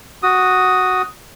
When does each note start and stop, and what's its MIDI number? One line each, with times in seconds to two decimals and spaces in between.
0.23 1.02 66
0.23 1.02 87